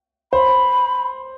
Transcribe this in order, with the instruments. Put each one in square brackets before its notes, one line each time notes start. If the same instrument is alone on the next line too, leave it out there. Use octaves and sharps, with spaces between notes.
[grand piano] C5 [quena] B5